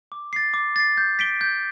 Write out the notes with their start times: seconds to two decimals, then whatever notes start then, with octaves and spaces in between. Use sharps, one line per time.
0.12 D6
0.33 A6 C7
0.54 D6
0.76 A6 C7
0.98 G6
1.19 B6 D7 G7
1.41 G6